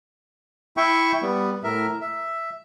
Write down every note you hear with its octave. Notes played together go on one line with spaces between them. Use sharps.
E4 E5 G5 C#6
G3 B3
A2 A#4 E5
E5